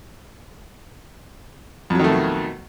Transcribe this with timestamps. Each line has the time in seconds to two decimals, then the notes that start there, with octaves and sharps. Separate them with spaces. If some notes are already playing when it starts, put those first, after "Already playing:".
1.90 F2
1.95 F#3
1.99 D#3
2.04 A3
2.09 B2